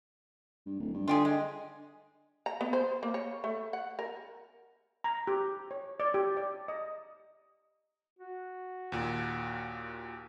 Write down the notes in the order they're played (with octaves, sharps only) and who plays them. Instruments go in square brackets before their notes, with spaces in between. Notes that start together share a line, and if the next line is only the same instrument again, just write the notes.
[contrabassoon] G2
D1
G2
[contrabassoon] D3 [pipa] F4 G4 G#4
[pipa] G#3
[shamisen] A#5
B3
C5
A#3
C#5
A3
F#5
A#4
[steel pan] A#5
G4
C#5
D5
G4
D5
D#5
[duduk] F#4
[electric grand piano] D#2 A#2